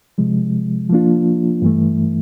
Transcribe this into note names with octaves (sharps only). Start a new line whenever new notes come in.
C3 F3 G#3
F3 A#3 D4 F4
G2 E3 A3